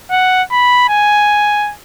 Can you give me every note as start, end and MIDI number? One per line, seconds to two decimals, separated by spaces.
0.11 0.42 78
0.51 0.89 83
0.89 1.72 80